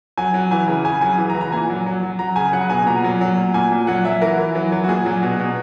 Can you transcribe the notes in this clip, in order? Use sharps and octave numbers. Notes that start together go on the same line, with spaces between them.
F#3 G#5
F#3
E3 G#5
C#3
C#3 G#5
F#3 G#5
E3
A#5
E3
A#5
A#2 G#5
F#3
F#3
F#3
F#3 A#5
C#3 G#5
F#3 F#5
B2 G#5
A#2 A#5
F#3
F#3
A#2
A#2 G#5
A#2
F#3 F#5
F#3 E5
E3 A#4
E3
F#3
F#3
F#4
A#2 G#4
F#3
B2
B2